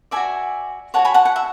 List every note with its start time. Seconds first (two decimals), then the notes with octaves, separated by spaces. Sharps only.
0.11 F#4 A4 D5 E5 G#5
0.94 F#4 A4 C#5 F#5 A5
1.05 G#5 B5
1.14 F#5 A5
1.25 F#5
1.36 E5